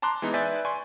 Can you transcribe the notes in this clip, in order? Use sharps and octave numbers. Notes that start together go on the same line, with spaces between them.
A5 A#5 C6 D6 F#6
E3 G#3 B3 D#4
B4 D5 E5 G#5 G6 A6
D5 G#5 C6 C#6